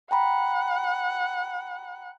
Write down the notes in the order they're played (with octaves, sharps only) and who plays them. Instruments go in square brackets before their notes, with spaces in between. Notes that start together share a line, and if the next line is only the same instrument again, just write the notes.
[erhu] F#5 [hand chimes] G5 A#5 B5